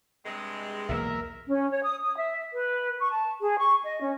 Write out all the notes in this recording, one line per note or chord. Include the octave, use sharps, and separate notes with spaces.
G2 C3 G#3
B1 E2 A#3 A#4 E5
C#4
C#5
D#6
D#6
E5
B4
C#6
A5
G#4
C#6
D#5
C#4